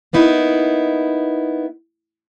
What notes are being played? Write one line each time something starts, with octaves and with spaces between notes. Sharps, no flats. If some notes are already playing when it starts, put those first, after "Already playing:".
A#3 B3 D#4 E4